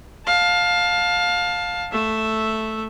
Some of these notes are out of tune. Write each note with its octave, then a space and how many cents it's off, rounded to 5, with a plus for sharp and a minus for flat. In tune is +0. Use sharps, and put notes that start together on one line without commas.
F5 +20 A5 +0
A3 +0 E5 +0